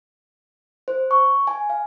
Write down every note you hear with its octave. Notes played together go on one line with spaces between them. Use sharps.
C5
C#6
G#5
F5